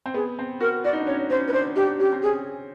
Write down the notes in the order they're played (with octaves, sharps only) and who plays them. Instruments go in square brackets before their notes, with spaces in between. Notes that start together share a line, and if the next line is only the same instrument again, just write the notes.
[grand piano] C4
[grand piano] B3 [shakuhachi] G#4
[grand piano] C4
[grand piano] F#4 [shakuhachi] A#4
[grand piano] F#4 [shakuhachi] D5
[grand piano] D#4
D4
[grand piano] C#4 [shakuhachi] C#5
[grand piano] C#4 [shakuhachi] C5
[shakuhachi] B4
[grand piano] D4 [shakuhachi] C5
[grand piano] D4 [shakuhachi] G4
[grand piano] C#4 [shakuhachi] G4
[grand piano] C4
[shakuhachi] G#4
[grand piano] C#4